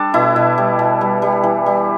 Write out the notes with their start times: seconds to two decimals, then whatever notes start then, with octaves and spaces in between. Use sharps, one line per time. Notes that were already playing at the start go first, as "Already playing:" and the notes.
Already playing: G3 D4 A4
0.14 B2 E4
0.36 B2
0.58 G3
0.79 B2
1.01 G3
1.22 G3
1.44 E3
1.66 G3